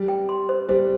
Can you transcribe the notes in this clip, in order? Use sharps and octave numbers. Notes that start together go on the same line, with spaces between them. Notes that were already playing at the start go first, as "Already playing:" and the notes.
Already playing: G3
G5
C6
C5
G3 C5